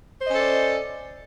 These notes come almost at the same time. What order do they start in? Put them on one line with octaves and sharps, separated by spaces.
C5 D#5 C#4 A4 D5